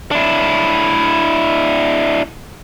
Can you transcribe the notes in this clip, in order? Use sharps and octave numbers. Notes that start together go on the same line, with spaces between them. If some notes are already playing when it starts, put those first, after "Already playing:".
D4 E4